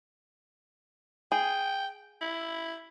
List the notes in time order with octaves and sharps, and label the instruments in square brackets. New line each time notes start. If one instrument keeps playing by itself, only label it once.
[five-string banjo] G#4 [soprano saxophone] G5
[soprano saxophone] E4